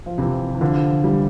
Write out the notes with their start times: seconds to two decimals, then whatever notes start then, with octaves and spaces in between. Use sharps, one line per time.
0.06 F3
0.18 C3 E3
0.55 E3
0.61 D3 F3
1.04 E3 G3